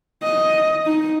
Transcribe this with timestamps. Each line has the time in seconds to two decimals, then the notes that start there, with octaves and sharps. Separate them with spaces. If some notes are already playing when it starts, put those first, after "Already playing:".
0.23 D#5
0.86 D#4